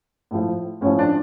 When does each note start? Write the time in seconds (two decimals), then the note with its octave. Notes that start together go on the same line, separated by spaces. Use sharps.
0.31 A2 F3
0.81 A2 F3 C#4
0.99 D4